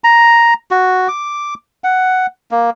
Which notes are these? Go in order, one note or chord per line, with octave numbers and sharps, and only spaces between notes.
A#5
F#4
D6
F#5
A#3